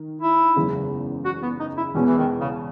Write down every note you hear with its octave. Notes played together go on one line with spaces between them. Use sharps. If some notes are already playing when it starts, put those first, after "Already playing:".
Already playing: D#3
E4
F#1 E2 C#3 G#3
F#4
B3
D#4
E4
E2 B2 G#3 B3 C#4
E3
D#3
C#3